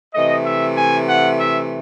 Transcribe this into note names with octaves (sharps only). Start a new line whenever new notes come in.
C3 E3 A3 D#5
E5
G#5
F#5
E5